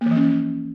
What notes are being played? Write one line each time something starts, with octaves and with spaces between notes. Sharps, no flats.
A#3
E3
F3
C#4